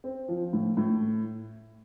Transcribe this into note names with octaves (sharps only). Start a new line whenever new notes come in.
C4
F3
A2
A2